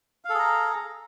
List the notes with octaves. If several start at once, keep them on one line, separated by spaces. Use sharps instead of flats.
G#4 A4 F5 A#5